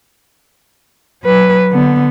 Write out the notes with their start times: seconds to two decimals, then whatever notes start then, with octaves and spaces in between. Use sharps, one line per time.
1.23 F#3 B4
1.72 D3 B3